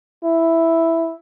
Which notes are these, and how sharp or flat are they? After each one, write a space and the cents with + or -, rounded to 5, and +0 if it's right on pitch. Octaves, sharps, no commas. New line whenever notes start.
E4 +0